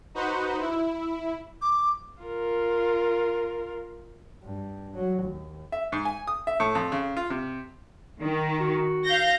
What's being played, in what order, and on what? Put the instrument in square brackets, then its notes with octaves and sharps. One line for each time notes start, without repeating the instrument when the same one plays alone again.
[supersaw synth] D#4 F#4 B4 C5
E4
[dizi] D6
[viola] F4 A#4
[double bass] G2
F#3
D#2
[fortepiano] E5
G#2
G#5
D#6
E5
A2
F2
C#3
F4
C3
[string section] D#3
[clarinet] F#4
[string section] F5 G6 A#6